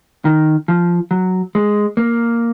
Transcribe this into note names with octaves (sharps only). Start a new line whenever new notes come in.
D#3
F3
F#3
G#3
A#3